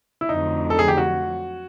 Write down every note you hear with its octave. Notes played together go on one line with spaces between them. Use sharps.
E4
F2 D3 F#3 A3 D#4
A4
G#4
G4
F#4